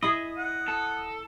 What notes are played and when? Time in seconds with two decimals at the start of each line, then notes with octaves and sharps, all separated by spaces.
0.03 E4 G#4 D#5
0.38 F#5
0.68 A4